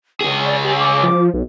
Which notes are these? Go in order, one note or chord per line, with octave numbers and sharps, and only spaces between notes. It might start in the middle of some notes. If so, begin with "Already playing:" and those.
C#2 G#4 G#5
D5
G4
D6
F3
B1